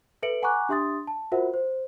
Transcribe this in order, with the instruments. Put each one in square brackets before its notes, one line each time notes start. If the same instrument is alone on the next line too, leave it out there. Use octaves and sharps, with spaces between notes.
[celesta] A4 B4 E5 C#7 D7 F#7
F#5 G#5 A#5 C#6 D6 F#6
D4 G4 E5 C6 D#6 A6
A5
F4 F#4 A#4 C5 E5 F#5
C5